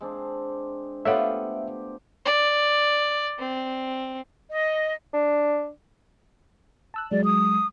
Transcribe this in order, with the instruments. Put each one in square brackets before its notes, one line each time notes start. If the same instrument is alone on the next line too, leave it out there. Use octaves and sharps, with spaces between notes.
[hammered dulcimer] G#3 C4 D4
[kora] A3 B3 F4 [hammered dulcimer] G4 [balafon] A4 C#5 F5 [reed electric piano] E5
[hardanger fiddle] D5
C4
[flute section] D#5
[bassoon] D4
[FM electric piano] A5 E6 F#6
[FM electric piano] F#3 G#3 [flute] D5
[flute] D#6